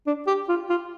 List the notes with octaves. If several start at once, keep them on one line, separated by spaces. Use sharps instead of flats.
D4
G4
F4
F4